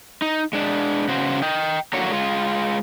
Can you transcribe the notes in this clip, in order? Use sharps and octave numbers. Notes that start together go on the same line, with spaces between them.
D#4
G#3 D4
C#3 F#4 C5
D#5 G5
D3 F#3 A#3 F#4 C#5
G#3 F4